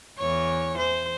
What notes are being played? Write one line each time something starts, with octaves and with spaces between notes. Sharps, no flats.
E2 E3 C#5
C5